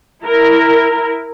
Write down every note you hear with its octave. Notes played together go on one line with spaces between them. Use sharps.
E4 A#4